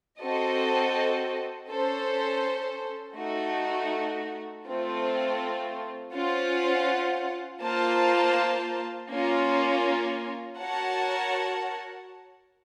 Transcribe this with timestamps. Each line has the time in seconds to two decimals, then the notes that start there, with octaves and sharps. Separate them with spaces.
0.21 C4 F#4 A4 D#5
1.69 C#4 A4 C5
3.17 A3 D#4 F#4
4.66 A3 C4 F4
6.14 C#4 F4 C5 F#5
7.61 A#3 F4 C5 F5 A5
9.10 A#3 C#4 F4
10.58 F#4 A#4 C#5 F#5 A5